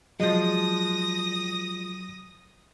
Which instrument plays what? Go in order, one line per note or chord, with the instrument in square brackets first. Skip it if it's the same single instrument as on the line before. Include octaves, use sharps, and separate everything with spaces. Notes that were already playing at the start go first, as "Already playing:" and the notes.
[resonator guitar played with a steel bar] F3 G#3 [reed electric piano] F#3 [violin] D#6 A#6